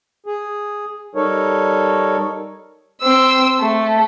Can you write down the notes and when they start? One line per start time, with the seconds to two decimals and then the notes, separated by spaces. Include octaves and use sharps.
0.26 G#4
1.15 G3 D#4 A4 A#4 C#5
3.02 C4 E6
3.60 A3